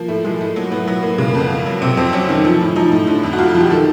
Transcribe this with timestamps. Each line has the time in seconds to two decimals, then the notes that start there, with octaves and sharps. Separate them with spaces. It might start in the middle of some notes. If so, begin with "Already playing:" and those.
Already playing: F3 A#3
0.08 A2 A3
0.24 F3 G#3
0.40 A2 A3
0.56 F#3 A#3
0.71 A2 B3
0.87 F#3 B3
1.03 A2 A#3
1.18 C#3 G#3
1.29 A#3
1.35 F2
1.40 B3
1.50 F2
1.66 F#3
1.82 C3 C4
1.97 F2 C4
2.13 F#3 C#4
2.29 D#3
2.45 F3
2.60 A2
2.76 F3 D#4
2.92 A2
3.07 D3
3.23 F2
3.33 F#4
3.38 F2 F4
3.49 F4
3.55 F3
3.60 G4
3.70 D#3 A4